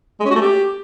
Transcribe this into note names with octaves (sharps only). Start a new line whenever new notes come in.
G#3
C#4
F#4
A3
G4